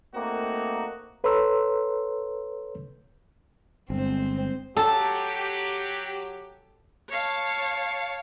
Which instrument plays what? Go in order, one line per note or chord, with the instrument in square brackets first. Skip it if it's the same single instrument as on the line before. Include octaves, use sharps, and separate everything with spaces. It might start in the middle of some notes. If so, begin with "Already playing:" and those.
[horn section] A3 A#3 C4 D#4 F#4
[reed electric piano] A4 B4 C#5 A#5 C6 E6
[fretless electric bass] G1 [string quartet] G#3 C4 C5
[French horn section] F#3 G4 [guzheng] A4
[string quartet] C#5 F5 A5